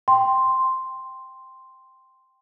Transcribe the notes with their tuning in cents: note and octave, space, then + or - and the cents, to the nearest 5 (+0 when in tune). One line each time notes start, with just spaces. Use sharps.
G5 +0 C6 +0